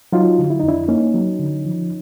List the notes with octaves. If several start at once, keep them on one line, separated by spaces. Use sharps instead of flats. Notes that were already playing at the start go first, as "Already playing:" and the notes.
F#3 D#4 F4
D3
E4
F2 D#4
D4 E4
A#3 C#4 D#4
F#3
D3
F3